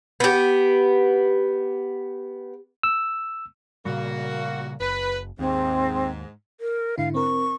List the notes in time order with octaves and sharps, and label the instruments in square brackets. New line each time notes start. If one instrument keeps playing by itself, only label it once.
[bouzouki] B3 G4
[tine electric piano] E6
[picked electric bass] A#2 C#3 G3 [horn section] A#3 F#4
[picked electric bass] F#1 [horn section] B4
[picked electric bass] D#2 [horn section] G#2 [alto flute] C4
[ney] A#4
[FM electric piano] G#2 D3 E4 [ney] F5
[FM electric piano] C4 A#4 [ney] C#6